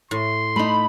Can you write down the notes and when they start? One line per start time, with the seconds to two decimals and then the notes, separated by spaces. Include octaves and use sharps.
0.11 A2 C6
0.56 A3 D#4 B5